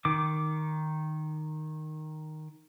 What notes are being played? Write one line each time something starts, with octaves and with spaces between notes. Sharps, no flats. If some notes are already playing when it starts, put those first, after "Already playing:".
D#3 D6